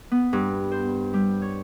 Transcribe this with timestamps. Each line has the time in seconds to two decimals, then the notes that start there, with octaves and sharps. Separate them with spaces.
0.12 B3
0.33 G2
0.72 C5
1.14 G3
1.42 C#5